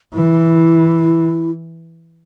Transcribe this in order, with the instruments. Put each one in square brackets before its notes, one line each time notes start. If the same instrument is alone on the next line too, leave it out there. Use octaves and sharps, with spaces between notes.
[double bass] E3 [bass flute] E4